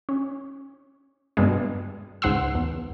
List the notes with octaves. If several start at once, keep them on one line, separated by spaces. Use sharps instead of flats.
C#4
G2 B2 G3 G#3
C#2 G#2 F#5 C6 E6
E2